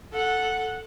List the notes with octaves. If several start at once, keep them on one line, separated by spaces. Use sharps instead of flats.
A4 F#5